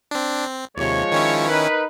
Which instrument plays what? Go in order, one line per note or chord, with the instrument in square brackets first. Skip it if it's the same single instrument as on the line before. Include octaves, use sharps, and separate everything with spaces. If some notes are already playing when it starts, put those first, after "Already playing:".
[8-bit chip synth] C4 D4
C4
[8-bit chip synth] D#2 C3 [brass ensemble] F3 G#3 C#5
[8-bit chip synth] D#3 C#4 E4
[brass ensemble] D#4 A#4 B4